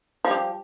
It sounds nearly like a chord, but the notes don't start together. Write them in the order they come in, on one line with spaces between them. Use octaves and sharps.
F3 G3 G4